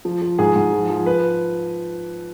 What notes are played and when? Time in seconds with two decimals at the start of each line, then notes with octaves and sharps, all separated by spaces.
0.05 F3
0.22 F3
0.39 G#2 G#4
0.56 G#2
0.73 F3
0.90 F3
1.06 B4